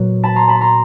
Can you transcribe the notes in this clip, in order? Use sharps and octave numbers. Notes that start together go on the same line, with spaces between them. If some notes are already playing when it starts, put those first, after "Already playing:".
Already playing: A#2 F#3 B3
A5 B5
A#5 C6
A5 B5
A#5 C6